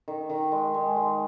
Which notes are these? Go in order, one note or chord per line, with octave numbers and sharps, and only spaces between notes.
D#3
D#3
G#3
G#3
G#3